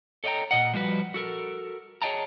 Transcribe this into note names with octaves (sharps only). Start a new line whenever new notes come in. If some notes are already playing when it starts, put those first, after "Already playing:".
A4 C#5 D#5 E5 G5 A#5
A#2 D#5 F#5
F3 G3 F#4 B4
F#4 A4 A#4
G#4 C#5 D#5 G5 A5 A#5